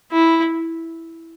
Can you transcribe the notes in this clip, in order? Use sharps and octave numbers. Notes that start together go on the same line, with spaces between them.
E4